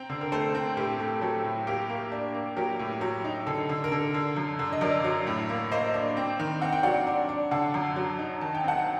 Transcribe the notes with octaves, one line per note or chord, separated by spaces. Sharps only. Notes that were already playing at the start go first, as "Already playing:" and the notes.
Already playing: C4 G5 A#5
D3
A#4
A3 A4 C5
C4
A2 G4 A#4
A3
F#3 A4
A2
A#3 G4 A#4
A#3
D4
A#3
F#3 G4 A#4
A2
F#3
D#4
D3 A4
D3
A#4
D3 A4
D3
F#2
D3
D#5
F#2 A#4 D5
F#3
A2
A#3
A#3 C5 D#5
D4
C4
D#3
C4 F#5
G5
F#3 D5 F#5
D4
D4
D3 F#5 A5
F#2
F#3
D#4
D#3 A5
G5
C4 F#5 A5